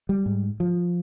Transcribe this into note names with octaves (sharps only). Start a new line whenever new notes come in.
G3
G#2
F3